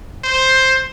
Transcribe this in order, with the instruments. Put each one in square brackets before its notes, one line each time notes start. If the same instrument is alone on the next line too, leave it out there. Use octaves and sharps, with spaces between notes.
[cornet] C5